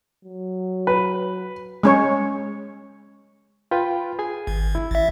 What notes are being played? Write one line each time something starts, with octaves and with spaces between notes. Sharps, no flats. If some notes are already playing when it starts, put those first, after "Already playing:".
F#3
B4
G#3 C#4 C#5
F4 B4 G5
G#4 G#5
G#1
E4
A1 E5